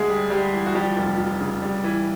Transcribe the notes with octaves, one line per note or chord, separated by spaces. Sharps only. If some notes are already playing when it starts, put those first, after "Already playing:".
Already playing: D2 G#3 G#4
G3
G3 G4
E3
F#4
F3 G3 G4
F1
F3
C#3
G3
E3